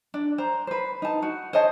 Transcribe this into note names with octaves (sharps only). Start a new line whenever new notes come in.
D4
C5 A#5
B4 C5
D#4 A5
F#4
C5 C#5 D#5 A5